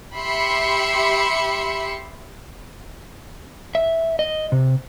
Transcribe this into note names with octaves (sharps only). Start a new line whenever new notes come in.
G4 E5 B5 C6 C#7
E5
D#5
C3